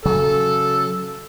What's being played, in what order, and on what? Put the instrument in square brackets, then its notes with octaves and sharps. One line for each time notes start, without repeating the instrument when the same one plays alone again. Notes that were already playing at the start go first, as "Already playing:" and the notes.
[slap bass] C#3 F#3 [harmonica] A4